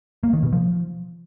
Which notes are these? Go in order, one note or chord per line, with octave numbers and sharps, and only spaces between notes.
A#3
D#3
B2
F3